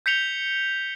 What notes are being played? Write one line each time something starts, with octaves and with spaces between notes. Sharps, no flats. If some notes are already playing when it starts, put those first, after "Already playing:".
G6 B6 C#7 F7 G7